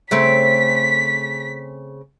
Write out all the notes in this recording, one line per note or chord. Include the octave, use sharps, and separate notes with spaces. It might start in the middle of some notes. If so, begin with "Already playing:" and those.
C#3 A3 C4 B6